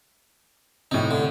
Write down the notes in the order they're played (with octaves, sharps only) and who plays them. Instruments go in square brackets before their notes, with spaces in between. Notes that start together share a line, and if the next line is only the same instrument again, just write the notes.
[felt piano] A2 C3 [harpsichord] D#4
[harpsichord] D3